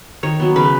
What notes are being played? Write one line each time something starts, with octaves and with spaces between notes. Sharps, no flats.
D#3 C#5
F#3 B3
C#3 B4